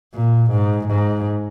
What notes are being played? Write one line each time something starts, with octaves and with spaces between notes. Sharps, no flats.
A#2
G#2
G#2